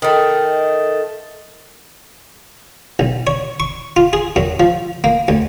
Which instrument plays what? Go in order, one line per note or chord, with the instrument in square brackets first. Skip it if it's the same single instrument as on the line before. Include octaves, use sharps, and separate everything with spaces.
[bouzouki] D#3 A3
[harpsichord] B1
C#5
C#6
F4
G#4
F#2
F3
A#3
D2